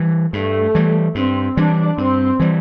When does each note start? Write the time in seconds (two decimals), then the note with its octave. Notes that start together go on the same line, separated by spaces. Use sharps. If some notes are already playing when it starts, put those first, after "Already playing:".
Already playing: E3 G3
0.33 G2 A3
0.75 E3 G3
1.15 G2 C4
1.57 E3 G3 D4
1.98 G2 C4
2.40 E3 G3